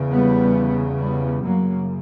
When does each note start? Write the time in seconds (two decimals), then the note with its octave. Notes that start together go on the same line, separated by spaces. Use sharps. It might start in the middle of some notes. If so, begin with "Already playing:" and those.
Already playing: E2 C#3
0.10 G3 B3
0.98 G3 B3
1.42 F#2 C#3 F#3 A#3